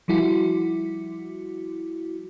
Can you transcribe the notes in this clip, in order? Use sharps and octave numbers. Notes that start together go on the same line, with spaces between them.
F3 G3 E4 F#4